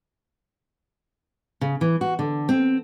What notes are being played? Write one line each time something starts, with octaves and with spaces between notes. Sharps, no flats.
C#3
E3
F#4
D3
C4